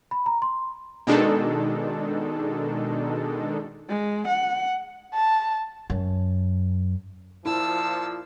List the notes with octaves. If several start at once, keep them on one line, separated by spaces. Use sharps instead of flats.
B5
A#5
C6
B2 D#3 G#3 D4 D#4 A4
G#3
F#5
A5
F#2
A#2 F3 E4 A5 E6